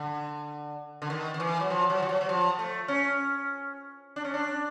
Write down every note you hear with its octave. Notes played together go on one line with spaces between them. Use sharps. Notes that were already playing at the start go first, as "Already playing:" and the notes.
Already playing: D3
D3
D#3
D#3
E3
F#3
F3
F#3
F3
F#3
F#3
F3
A3
C#4
D4
C#4
D4